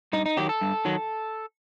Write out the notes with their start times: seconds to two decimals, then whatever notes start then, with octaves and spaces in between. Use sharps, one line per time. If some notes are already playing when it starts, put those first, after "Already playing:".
0.13 G2 D#4
0.26 D#4
0.37 D#3 F#3 G4
0.49 A4
0.61 G2
0.85 D#3 F#3